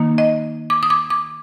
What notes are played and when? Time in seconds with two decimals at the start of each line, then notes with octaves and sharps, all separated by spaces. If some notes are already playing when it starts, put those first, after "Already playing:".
Already playing: D#3 A#3 D#4
0.18 D#5
0.70 D6
0.83 D#6
0.90 D6
1.10 D6